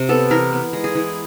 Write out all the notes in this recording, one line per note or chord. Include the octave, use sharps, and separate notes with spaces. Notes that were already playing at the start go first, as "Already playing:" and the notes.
Already playing: C3
B3 A4
E3 A#4
B3
G#3
G#4
E3